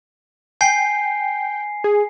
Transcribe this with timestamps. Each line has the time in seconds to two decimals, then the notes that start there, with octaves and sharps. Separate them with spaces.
0.61 G5 G#5 C7
1.84 G#4